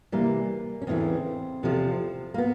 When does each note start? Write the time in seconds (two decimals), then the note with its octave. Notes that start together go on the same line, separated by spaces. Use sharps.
0.12 C3 E3 G3 A#3
0.82 C#4
0.87 E2 C#3 E3 A3 C4
1.63 E2 C3 F3 A3
2.34 A#3
2.38 B3